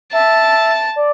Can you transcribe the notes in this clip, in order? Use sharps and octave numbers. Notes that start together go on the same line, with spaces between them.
E5 A5
D5